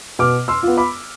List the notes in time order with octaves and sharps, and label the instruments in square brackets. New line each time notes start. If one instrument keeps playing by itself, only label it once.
[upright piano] B2 D6 F6
C6 E6
B3 F4
B5 D6